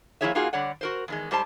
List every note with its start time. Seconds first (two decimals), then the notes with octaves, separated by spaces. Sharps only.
0.21 F3 A#3 E4 G#4 C#5 E5
0.35 A#3 D#4 F4 F#4 G#4
0.53 D3 G3 C#5 D5 F#5
0.81 F#4 A#4 C5
1.08 E2 D#3 G#3
1.31 G#2 G3 C5 A5